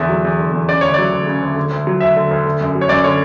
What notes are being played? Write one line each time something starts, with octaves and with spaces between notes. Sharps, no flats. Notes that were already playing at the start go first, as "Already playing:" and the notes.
Already playing: E2 D3 E5
F#3
E2
D3
E2
C#3 D5
D2 C#5
F#3 D5
D2
C#3
D2
D3
D2
F#3
D2 E5
D3
D2
D3
F#2
F#3
C#5
F#2 D5
D3 C#5